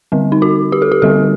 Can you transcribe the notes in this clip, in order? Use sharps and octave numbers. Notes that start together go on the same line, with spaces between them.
D3 G3 C4
D#4
F#4
G4
A4
G4
D3 G3 C4 A4